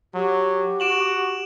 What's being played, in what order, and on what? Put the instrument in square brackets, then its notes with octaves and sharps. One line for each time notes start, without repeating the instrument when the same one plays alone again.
[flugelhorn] F#3 [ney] G4
[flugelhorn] F#4 [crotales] D7 E7 F#7